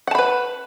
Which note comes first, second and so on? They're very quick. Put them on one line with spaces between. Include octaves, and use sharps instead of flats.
F#5 A5 B5 B4